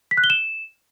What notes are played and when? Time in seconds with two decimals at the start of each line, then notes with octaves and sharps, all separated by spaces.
0.11 B6
0.17 F#6
0.24 G7
0.30 E7